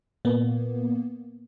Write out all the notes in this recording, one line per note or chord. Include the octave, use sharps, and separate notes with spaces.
A#2 A#3 B3